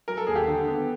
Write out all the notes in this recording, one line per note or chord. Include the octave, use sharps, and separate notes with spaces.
F#3 A#4
A4
D#2 G#4
G4 A4
D3
B3